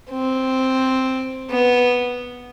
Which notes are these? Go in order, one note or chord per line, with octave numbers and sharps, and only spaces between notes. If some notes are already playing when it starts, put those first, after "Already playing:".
C4
B3